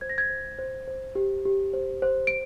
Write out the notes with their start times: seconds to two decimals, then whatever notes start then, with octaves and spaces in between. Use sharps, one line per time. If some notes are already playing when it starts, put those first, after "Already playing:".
0.01 C5 G#6
0.09 A#6
0.18 G#6
0.30 C5
0.59 C5
0.88 C5
1.15 G4
1.45 G4
1.73 C5
2.02 C5
2.27 D7